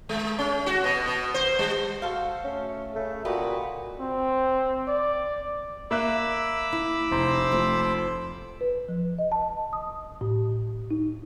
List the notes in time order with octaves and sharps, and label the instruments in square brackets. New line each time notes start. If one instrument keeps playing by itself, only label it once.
[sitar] G#3
C#4
F#4
B2
B2
C5
G3
[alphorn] F#4 [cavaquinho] A4 C5 F5
[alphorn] A3 [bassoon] C#4
[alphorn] C#3 [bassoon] A3
[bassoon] A#2 [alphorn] F#4 [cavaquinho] G4 B4 D#5
[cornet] C4
D5
[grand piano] A#3 E5 F#6 [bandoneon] B5 D6 E6
[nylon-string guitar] E4
[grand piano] F1 A#5 [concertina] C5
[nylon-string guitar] F3 A3 C4
[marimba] B4
F3
D#5
A5
D#6
A2
D#4